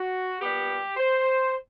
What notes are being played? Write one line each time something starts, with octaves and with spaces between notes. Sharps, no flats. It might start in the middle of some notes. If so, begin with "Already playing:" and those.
Already playing: F#4
A#2 G3 B3 G4
C5